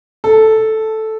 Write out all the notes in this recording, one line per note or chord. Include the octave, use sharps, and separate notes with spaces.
A4